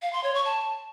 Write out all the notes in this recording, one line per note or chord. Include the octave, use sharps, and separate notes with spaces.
F5
C6
C#5
C#6
A5